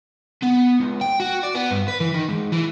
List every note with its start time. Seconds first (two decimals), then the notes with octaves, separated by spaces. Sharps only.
0.43 B3
0.80 C#2
1.01 G5
1.20 F#4
1.43 D5
1.55 B3
1.71 G2
1.88 B4
2.00 E3
2.14 D#3
2.28 G#2
2.52 E3